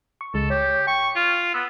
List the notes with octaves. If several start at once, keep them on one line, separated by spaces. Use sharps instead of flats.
C#6
C#2 G#3 A4
G4 C#5
G5 C#6
F4
B3 E6